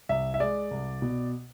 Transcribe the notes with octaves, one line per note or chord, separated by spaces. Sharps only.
C2 E5
E5
G#3 D5
C2
B2